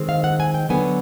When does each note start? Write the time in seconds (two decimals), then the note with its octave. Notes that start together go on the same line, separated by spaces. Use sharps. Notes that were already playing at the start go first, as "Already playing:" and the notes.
Already playing: D#3 G#3 C4
0.09 F5
0.24 F#5
0.40 G#5
0.54 G5
0.69 D3 F#3 B3 G#5